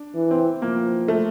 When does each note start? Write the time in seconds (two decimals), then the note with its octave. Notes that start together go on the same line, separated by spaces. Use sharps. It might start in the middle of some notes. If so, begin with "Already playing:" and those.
Already playing: D4
0.15 E3
0.31 C4
0.62 F3 A#3
1.08 A3